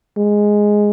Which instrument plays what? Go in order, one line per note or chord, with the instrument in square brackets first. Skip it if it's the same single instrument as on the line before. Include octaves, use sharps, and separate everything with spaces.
[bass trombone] G#3